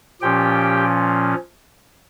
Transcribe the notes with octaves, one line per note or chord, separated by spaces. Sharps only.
A#2 F3 C#4 G4 G5